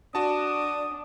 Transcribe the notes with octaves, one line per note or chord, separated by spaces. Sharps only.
D4 F#4 A5 D#6